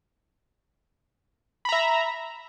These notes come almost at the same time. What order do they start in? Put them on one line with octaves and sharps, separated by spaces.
B5 A#5 E5